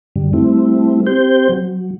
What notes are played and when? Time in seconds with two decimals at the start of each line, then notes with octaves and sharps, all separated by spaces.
0.16 F#2 D3 G3
0.33 G3 A3 C4 E4
1.07 C4 G4 C5 G6
1.49 F#3